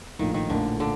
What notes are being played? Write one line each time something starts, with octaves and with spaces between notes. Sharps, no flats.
A#1 A2 D#3 F3 A#3
D#3
A#1 A2 D3 F3 A#3
D3